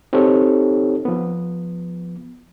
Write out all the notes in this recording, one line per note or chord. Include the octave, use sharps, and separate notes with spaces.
C4 D#4 G4 A4 C#5
F3 B3